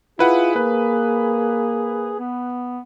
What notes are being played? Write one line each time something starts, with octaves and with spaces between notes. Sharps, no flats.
E4 F4 G#4 B4 F#5
A#3 B4
B3